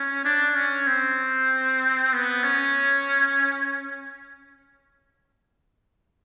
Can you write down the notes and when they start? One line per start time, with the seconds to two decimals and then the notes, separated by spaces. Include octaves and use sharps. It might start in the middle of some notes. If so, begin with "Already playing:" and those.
Already playing: C#4
0.25 D4
0.55 C#4
0.87 C4
2.13 B3
2.43 C#4